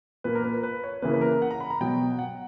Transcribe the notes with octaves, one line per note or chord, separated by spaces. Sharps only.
A#2 A#3 B4
A#4
B4
B4
C#5
C#3 E3 A#3 B4
B4
A#4
F#5
A#5
B5
A#5
B2 F#3 B3 G5
F#5